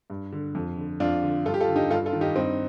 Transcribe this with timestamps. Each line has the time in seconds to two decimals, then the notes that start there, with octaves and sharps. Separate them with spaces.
0.10 G2
0.32 D3
0.55 F2
0.77 D3
1.00 F2 D4 F4
1.23 D3
1.46 G2 F4 A4
1.54 G4
1.61 F4 A4
1.68 D3
1.76 D#4 G4
1.90 G2 F4 A4
2.06 F4 A4
2.13 D#3
2.21 D#4 G4
2.36 G2 C4 D#4